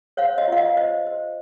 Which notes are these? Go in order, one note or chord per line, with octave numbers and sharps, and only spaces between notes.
C5 C#5 F5
D#5
F4 F5
D#5
C5 D#5
C5